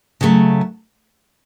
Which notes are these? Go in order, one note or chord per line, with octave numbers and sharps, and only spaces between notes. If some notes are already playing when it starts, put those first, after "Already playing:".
C#3 F#3 A3